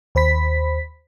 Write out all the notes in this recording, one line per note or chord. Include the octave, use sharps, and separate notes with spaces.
D#2 C5 B5 B6